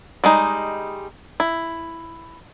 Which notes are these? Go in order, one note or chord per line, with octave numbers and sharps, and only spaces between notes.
G3 G#3 D#4
E4